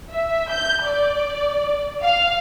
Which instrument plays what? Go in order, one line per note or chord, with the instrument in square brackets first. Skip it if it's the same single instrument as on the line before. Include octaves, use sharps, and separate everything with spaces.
[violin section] E5
G6
D5
F5